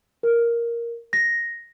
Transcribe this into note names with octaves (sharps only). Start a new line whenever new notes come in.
A#4
A#6